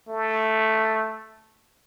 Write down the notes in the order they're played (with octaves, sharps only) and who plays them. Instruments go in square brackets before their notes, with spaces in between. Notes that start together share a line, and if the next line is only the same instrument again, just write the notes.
[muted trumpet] A3